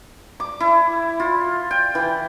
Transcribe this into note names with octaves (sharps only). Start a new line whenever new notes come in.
D6
E4
F4
G5
E3